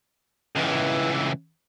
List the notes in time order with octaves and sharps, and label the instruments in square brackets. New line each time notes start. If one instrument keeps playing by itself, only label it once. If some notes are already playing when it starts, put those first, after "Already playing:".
[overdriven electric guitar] C#2 E3